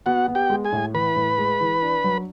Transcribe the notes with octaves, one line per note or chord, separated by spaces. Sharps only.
B3 F#4 F#5
B3
G4 G5
G#3
G#4 G#5
A2
E3 B4 B5
A2
G#3
E3
D4
F#3